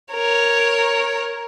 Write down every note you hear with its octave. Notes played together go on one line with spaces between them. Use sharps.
A#4 C#5